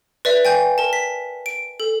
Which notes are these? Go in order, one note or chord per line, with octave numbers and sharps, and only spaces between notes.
B4 D5 E5
G5 G#5 G6
A#4 A5
B6
D7
A4